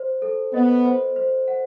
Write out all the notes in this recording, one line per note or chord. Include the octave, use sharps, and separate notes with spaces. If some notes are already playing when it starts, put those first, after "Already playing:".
Already playing: C5
A4
B3 D#5
C5
C5
F#5